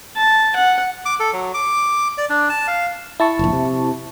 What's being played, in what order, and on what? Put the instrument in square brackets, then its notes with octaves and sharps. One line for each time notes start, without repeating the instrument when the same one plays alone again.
[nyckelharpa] A5
F#5
[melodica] D6
A4
F#3
D6
D5
D4
A5
F5
[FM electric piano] E4 A5 C#6
[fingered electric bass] F1 A#1
C3